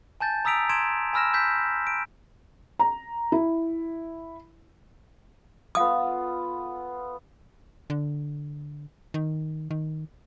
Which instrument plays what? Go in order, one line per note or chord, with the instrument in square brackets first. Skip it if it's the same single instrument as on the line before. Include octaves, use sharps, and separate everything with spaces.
[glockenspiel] G#5 A5 G6 A6
A#5 D#6 E6 B6 D7 F7
C6 G#6 D7 E7
G#5 B5 E6 F6 A#6 E7
E6 G6 B6
D7
[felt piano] A#5
E4
[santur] B3 F4 A4 [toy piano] F5 D#6
[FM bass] D3
D#3
D#3